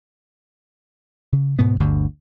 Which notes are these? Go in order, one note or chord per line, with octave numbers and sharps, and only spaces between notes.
C#3
D2 G#2 B2 B3
G1 D2 G2 D3